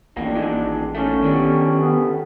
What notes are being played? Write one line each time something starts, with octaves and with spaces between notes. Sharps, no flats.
A1 D#2 A2 A#3 D4
A#2 D#3 G#3
A2 D#3 A3 C#4
B2 D3 D#3 G3
B3